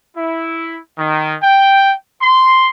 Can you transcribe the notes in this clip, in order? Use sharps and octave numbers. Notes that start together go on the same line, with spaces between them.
E4
D#3
G5
C6